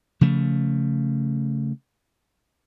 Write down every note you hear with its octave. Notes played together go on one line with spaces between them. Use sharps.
C#3 F3 A3